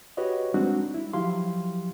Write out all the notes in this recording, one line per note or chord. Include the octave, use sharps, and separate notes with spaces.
F#4 G4 B4 C#5 D#5
G3 G#3 C4 D4 D#4 F#4
E4
F3 F#3 E4 G4 F5 C6